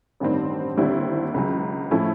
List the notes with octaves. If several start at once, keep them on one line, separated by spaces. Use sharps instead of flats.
A1 G2 D#3 G3 C4
D#2 D3 G3 C4 E4
C#2 C#3 F#3
A2 F3 A3 C#4 E4